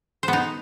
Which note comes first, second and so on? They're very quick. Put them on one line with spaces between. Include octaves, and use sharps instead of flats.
C5 B3 D#4